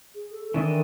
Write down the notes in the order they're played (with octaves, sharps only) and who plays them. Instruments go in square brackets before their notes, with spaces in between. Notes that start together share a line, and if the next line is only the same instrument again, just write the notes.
[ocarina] G#4
[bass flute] A4
[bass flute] D#3 [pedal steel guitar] E3 D4 D#5 [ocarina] A4